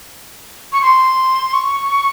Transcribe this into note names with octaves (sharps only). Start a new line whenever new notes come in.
C#6
C6
C#6